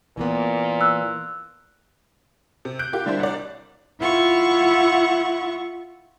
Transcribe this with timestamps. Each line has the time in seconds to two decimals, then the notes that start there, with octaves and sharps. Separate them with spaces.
0.17 A#2 E3 A#3 B3
0.81 E6 F#6
2.65 C3
2.79 F#6 G6 D7
2.92 F4 G4 A#4
3.06 D3 G3 D4 E4 C5
3.19 C2 D5
4.01 E4 F4 E5 F#5 C#6